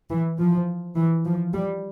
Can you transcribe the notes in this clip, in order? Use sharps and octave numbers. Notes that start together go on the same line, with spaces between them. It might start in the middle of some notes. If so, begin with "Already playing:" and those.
E3
F3
E3
F3
G3